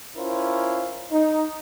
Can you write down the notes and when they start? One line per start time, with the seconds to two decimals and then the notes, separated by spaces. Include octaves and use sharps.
0.17 C#4 E4 F4 A#4 C5
1.12 D#4